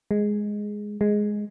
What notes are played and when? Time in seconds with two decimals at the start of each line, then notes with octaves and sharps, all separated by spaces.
0.11 G#3
1.01 G#3